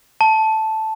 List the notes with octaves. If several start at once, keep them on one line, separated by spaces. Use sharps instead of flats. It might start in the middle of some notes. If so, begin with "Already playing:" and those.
A5